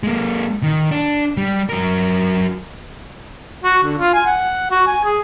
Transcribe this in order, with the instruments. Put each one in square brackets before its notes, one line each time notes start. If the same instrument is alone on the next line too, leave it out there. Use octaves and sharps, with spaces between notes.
[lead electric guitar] G#3 A#3
D#3
D4
G3
F#3 A#4
[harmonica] F#4
D3
F4
G#5
F#5
F#4
G#5
G#4